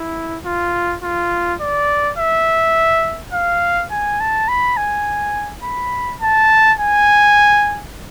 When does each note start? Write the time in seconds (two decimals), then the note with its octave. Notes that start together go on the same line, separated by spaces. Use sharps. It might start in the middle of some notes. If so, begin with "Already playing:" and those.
Already playing: E4
0.45 F4
1.03 F4
1.61 D5
2.18 E5
3.33 F5
3.91 G#5
4.21 A5
4.49 B5
4.77 G#5
5.64 B5
6.22 A5
6.79 G#5